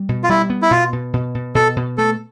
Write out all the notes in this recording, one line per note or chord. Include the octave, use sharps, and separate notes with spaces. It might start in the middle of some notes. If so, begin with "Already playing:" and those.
Already playing: G3
B2
F4
G3 E4
B3
E4
B2 F4
B2
B2
B2
B2 A4
B2
A3 A4